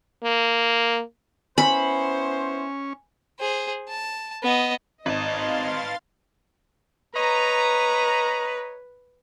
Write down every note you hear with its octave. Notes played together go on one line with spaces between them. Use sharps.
A#3
B3 C#4 E4 C5 G#5 B5
G#4 C5
A5
B3 D#5
G#1 B4 D#5 F5 A5 C6 A6
B4 C#5 D#5 A#5